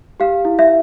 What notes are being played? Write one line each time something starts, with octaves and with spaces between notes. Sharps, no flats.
G4 F5
E4
E5